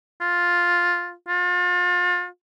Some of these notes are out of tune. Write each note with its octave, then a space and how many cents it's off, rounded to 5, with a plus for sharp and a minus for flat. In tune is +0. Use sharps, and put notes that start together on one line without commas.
F4 +5
F4 +35